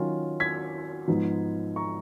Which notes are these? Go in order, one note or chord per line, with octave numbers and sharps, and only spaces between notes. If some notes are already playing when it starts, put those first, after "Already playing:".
Already playing: D#3 F#3 C#4 F4
G#6 B6
G#2 F3 B3 D#4
A#5 C#6